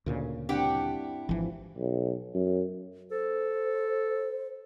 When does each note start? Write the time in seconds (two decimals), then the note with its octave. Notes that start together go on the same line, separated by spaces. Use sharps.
0.06 D2 A#2 C#3
0.49 G2 C4 D4 E4 G4 F#5 G5
1.29 G#1 E3 F3
1.77 B1
2.34 F#2
3.11 A4 C5